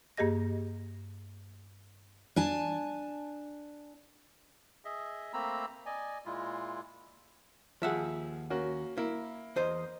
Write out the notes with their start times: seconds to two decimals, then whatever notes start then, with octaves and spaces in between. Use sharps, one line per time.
0.17 G2 A#3 G4 G#4 D#5 A#6
2.36 D4 G#5 A5
4.85 G#4 D#5 E5
5.33 A3 A#3 C4 A#5 B5 E6
5.86 D5 D#5 G#5
6.26 A#2 G#3 E4 F4
7.82 D#2 F3 G#4 E5 F#5
8.50 A#3 C#4 F#4
8.98 A#3 E4
9.56 E2 C5 D#5